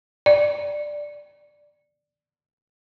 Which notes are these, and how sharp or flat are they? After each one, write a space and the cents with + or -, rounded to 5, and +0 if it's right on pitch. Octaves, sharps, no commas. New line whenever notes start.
D5 +5